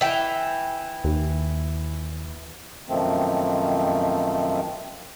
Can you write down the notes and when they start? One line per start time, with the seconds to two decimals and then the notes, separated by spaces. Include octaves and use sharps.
0.01 E3 G5
1.04 D#2
2.89 F#2 B2 D#3 F3 A3 C4